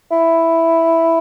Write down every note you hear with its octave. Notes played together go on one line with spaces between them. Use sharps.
E4